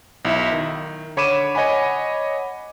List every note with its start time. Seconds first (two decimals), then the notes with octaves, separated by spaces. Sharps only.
0.25 B1 E4 E5
0.52 D#3
1.17 D3 C#5 B5 D6 D#7 E7
1.55 C#5 D#5 F#5 G#5 B5